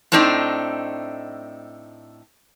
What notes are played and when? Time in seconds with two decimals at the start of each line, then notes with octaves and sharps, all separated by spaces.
0.12 A2 A3 C4 D4 D#4